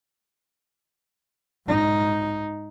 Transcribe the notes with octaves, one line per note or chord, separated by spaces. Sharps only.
G#2 D#4